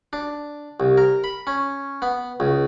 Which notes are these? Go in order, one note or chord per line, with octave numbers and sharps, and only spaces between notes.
D4
C2
A#4
B5
C#4
B3
C#2